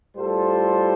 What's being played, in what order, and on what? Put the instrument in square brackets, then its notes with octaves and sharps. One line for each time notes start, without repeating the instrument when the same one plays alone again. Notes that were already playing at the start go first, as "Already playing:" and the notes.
[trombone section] A2 G3 F4 A4 C5